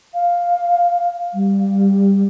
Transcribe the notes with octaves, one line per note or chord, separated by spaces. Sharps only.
F5
G3